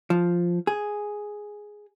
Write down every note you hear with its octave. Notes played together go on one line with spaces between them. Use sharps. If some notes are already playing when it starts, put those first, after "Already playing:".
F3
G#4